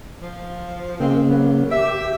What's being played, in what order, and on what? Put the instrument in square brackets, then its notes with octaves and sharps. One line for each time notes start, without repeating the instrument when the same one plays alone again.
[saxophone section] F3
[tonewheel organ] C#3 A#3 [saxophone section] G#3 C4
[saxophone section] F#3 B3
[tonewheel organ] G4 [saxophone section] E5